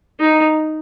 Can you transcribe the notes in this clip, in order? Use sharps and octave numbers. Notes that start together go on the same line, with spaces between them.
D#4